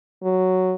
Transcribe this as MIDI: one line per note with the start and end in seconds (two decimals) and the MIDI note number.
0.24 0.75 54